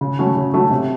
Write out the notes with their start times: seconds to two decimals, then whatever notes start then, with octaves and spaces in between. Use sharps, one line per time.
0.01 C#3
0.19 F#3 A3 C#4 F#4
0.37 C#3
0.53 F#3 A3 C#4 F#4
0.71 C3